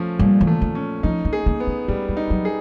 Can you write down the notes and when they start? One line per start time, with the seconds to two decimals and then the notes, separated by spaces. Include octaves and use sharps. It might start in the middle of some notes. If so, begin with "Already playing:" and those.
Already playing: F3 A3 C#4
0.19 A#2 G3
0.41 E3
0.47 A3
0.61 D#3
0.75 C#4
1.03 F3 D#4
1.25 A#3
1.33 G#4
1.46 A#3
1.60 B3
1.67 A3
1.88 G3 A3
2.09 G#3
2.17 D#4
2.30 F#3
2.45 G#4